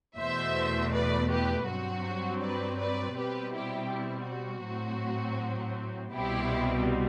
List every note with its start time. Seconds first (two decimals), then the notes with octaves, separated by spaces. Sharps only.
0.18 E2 B2 A3 C5 E5
0.92 B4 D5
1.30 G4 B4
1.67 G2 F#3 C4 F#4
2.42 B4 D5
2.79 B4 D5
3.16 B2 G3 C4 G4 B4
3.53 E4 G4
3.91 E4
4.28 F#4
4.65 A2 F#3 C4
6.14 C2 B2 G3 C4 E4 G4